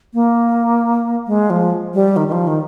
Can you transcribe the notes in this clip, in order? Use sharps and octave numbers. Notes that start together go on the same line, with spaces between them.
A#3
G#3
F3
G3
D#3
D#3
F3
D#3